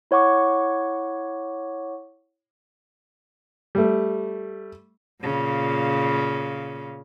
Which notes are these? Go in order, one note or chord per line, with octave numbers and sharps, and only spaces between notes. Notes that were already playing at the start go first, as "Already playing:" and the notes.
E4 C#5 F#5 C#6 D6
G3 A3
A#2 C#3